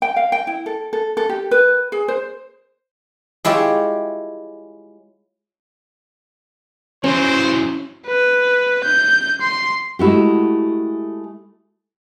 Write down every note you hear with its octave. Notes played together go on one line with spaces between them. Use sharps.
G5
F5
G5
E4
A4
A4
A4
G4
B4
G#4
C5
G#3 E4 F4 G4 C#5
E3 F#3 C#4 C5
B4
G6
C6
G#3 A3 E4 F#4 G4